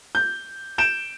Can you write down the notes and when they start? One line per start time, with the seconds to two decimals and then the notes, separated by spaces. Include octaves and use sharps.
0.15 G6
0.78 G6 D7 E7